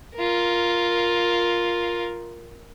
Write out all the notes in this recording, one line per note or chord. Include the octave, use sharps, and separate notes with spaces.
F4 A#4